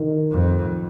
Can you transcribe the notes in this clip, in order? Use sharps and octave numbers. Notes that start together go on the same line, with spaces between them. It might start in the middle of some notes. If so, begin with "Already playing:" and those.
Already playing: D#3
F2